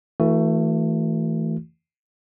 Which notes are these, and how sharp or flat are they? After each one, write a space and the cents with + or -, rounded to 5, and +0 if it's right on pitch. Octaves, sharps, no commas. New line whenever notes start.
E3 -15 A3 +20 F#4 -10